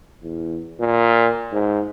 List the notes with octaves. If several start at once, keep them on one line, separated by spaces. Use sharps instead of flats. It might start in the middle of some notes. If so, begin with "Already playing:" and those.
E2
A#2
G#2